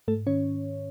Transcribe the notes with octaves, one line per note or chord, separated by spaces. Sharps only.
G#2 A3 A4
D#3 C#4 C#5